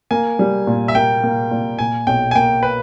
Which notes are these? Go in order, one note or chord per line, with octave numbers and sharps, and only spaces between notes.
A#3 G#5
G3
A#2
E5
A#3 G5
A#3
A#2
A#2 G#5
B1 G5
G#5
A#3 G5
B4